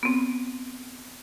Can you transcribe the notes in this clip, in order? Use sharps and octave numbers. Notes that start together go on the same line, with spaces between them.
B3 C4